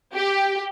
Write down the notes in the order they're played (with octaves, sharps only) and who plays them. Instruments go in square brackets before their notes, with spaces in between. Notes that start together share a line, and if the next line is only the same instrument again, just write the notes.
[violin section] G4